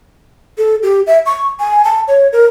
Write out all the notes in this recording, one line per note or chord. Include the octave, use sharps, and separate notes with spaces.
A4
G4
E5
C#6
G#5
A5
C#5
A#4